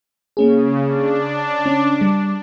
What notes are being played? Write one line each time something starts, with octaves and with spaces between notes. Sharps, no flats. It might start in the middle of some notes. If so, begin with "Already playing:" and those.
C#3 A#3 C#4 G#4
D4
C#4
G3